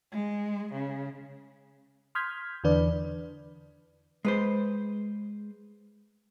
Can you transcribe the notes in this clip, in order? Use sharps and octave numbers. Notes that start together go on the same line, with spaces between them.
G#3
C#3
C6 D#6 F6 G6 G#6 B6
E2 D3 E3 D4 B4 D5
G#3 B4 C5